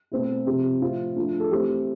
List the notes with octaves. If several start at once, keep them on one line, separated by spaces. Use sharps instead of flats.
B2 A3 C4 E4
C3 F3 C4 G4
A2 F3 C4 E4 F4
F3 A3 D4 F4
A4
E3 A3 C4 E4 G4